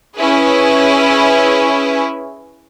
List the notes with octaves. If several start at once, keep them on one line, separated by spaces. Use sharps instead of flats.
C#4 E4 G#4 B4